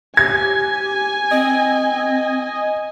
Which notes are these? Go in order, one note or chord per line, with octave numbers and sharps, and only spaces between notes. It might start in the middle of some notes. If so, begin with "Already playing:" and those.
G4 G#5 G#6
C4 D#5